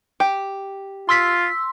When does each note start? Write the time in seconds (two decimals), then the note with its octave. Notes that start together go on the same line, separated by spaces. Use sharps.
0.20 G4
1.09 F4 C6 E6 B6